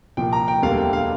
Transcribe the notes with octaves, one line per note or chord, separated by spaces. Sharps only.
C2 A#2 F3 G5
A#5
G5
E1 D2 D3 G3 A#3 F5
G5
F5